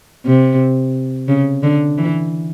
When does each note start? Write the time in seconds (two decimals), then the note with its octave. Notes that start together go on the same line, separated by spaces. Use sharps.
0.26 C3
1.28 C#3
1.63 D3
1.97 E3